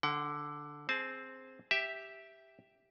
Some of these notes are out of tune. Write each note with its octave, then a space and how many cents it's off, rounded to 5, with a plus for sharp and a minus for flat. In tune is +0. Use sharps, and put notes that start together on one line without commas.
D3 +0 F#5 +40
C4 +0 G#4 +0 A5 -30
G4 +0 E5 +0